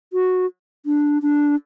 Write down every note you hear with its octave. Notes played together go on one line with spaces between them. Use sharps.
F#4
D4
D4